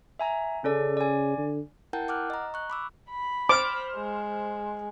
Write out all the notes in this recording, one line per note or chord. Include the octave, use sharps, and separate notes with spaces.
E5 G#5 A#5
C#3 C#4 A4 D5
D5 G#5
D3
E4 A#4 F#5 G5 A5 G6
F#5 D6 F6 F#6
D#5 A#5
C#6 F#6
B5 D6 E6
B5
C5 D6 F6
G#3